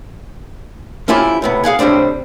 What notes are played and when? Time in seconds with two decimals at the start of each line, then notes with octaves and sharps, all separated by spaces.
1.08 F2 C#4 E4 F4 G4 G#5
1.42 A2 C3 B3
1.64 G#4 F5 F#5 G#5
1.79 A2 C3 G3 C4 D4